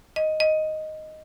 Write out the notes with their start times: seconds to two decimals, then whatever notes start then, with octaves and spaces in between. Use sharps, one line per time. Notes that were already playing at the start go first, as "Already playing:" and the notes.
0.16 D#5
0.40 D#5